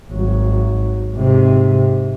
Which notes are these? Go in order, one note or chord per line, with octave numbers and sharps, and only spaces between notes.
G#1 F#3
G#2 C3